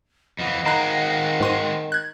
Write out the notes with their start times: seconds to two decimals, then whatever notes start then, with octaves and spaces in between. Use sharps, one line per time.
0.39 F2 E3 D#5 F5 F#5
0.66 D#3 G#3 C4 A#5 B5 F#6
1.40 G#2 C6 D#7
1.92 F#6 G#6